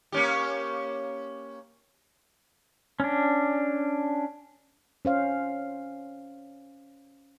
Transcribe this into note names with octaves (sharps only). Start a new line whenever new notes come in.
A#3 C#4 G4
C#4 D4
C#4 C5 F5